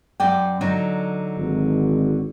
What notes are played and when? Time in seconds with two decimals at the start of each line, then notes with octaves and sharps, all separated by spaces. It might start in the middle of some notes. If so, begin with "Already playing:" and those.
0.20 F#2 D5 G5
0.61 D3 F#3 D#4
1.36 G#1